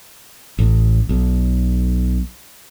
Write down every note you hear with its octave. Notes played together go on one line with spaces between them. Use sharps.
A1
B1